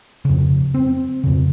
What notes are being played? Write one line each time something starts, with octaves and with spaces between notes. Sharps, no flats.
F2 C#3
C4
F2 C#3